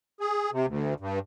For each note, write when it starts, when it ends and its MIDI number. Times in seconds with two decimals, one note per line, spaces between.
0.20 0.50 68
0.52 0.66 48
0.67 0.94 38
1.00 1.19 43